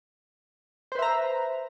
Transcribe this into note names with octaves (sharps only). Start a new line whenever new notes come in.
B4 C5 E5 A#5